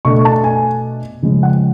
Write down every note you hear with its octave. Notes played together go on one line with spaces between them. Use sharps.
B2 A3 D4 C#6
A5
G#5
C#3 F3 G#3
F#5